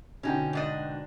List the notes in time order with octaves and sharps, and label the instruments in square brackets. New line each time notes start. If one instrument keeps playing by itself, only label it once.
[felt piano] B2 D3 G5 [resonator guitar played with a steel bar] C#4 D#4
[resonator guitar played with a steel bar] G#2 D4 D#5